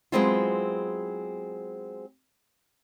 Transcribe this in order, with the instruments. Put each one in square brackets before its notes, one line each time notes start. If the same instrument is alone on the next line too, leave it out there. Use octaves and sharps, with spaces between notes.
[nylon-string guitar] F#3 G#3 B3 C4 E4 F4